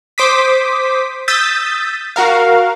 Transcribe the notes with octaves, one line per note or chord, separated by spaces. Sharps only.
C5 D6 D#6 B6
D#6 E6 G6 A6 B6
F#4 A#4 F5